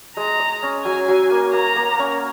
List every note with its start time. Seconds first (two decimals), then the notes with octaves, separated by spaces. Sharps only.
0.17 G#3 A#5
0.40 D#5
0.63 C#4
0.85 F#3 G#5
1.08 F#3
1.31 A#3
1.53 A#3 A#5
1.76 A#3
1.99 C#4